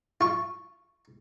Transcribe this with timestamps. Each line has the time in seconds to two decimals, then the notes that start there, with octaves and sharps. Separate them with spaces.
0.21 F4 C#6